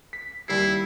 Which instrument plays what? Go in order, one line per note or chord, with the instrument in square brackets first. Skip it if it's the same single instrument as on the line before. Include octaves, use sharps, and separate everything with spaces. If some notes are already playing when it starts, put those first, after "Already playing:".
[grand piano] B6
[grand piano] D#2 G3 C7 [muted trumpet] E4